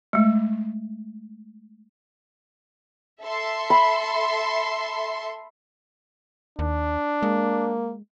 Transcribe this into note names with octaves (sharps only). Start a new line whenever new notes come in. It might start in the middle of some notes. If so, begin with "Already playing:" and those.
G#3 A3
A4 E5 C6
B5
D#2 D4
G#3 A#3